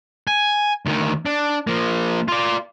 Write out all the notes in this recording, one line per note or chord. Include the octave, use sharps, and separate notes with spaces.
G#5
D2 D#3
D4
F3 A#3
F4 D5